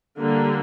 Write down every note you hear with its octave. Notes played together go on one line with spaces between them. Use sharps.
D3 G3 A#3